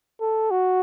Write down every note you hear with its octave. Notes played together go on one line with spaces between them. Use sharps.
A4
F#4